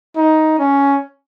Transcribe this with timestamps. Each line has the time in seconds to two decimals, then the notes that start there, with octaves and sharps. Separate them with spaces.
0.16 D#4
0.59 C#4